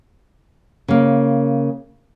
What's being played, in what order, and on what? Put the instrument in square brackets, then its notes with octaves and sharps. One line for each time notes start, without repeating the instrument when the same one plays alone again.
[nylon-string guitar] C#3 A#3